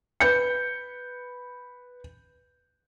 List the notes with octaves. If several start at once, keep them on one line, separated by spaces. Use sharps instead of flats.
B4 G6 C#7